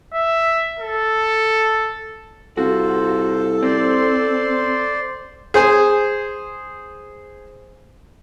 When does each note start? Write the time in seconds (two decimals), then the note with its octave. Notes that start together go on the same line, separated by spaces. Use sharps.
0.14 E5
0.80 A4
2.57 C2 F4 F#4 A4 C5
3.63 C4 C5 D5 C6
5.54 G#4 C5 G#5